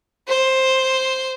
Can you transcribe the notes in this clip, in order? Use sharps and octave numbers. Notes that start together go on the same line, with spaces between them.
C5